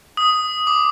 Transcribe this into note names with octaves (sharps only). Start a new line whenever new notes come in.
D#6
D6